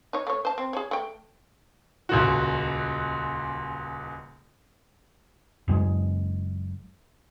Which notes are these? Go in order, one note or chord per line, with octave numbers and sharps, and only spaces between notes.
D#4 C#5
A3 C#5
C5 A5
C4
G#4 C#5
A3 G5
D#1 C#2 F#4
F#1 F#2 A2 G#3